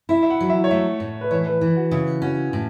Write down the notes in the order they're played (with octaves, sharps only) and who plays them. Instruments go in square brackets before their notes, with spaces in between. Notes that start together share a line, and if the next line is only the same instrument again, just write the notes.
[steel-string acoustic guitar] E4 [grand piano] E5
[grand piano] E5
F#5
[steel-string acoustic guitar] F#3
[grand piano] E5
C#5
[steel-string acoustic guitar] A3 [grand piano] E5
[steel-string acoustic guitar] A2
[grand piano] B4
[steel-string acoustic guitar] E3 [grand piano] C#5
[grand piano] B4
[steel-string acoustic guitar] E3
[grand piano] F#4
[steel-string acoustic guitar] C#3 [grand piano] E4
[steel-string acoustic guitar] C#4 [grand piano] F#4
[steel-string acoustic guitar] A2